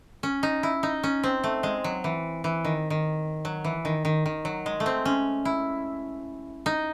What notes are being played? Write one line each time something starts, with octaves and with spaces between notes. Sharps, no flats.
C#4
D#4
E4
D#4
C#4
C4
A3
G#3
F#3
E3
E3
D#3
D#3
F#3
E3
D#3
D#3
D#3
F#3
G#3
A3
C4
C#4
E4
D#4